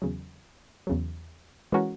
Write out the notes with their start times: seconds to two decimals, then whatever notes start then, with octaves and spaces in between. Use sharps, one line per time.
0.02 E2 C#3 F#3
0.87 E2 C#3 F#3
1.72 E3 G#3 C#4 F#4 A#4